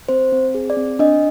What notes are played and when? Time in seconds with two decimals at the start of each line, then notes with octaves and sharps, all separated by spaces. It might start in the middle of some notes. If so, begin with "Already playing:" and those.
0.09 C4 C5
0.32 C4
0.55 G#4
0.70 D5
0.77 C4
0.99 D4 D#5